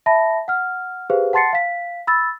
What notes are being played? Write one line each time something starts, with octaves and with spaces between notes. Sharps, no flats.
E5 A5 B5 A#6
F#5 F6
G4 G#4 B4 C5 F5
F#5 A5 C6 A6 C7 C#7
F5 B6
B5 E6 A6